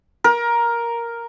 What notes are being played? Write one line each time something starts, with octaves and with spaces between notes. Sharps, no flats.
A#4